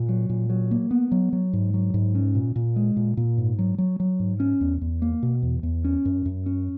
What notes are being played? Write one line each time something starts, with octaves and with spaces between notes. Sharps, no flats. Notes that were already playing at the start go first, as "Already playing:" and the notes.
Already playing: A#2
F#3
A#2
F#3
A#3
B3
F#3
F#3
G#2
F#3
G#2
C#4
A#2
A#2
G#3
A#2
A#2
G#2
F#3
F#3
F#3
G#2
C#4
E2
E2
A#3
B2
E2
E2
C#4
F#2
F#2
C#4